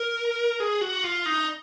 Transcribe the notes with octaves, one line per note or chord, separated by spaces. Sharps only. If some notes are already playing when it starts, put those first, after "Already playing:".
Already playing: A#4
G#4
F#4
F4
D#4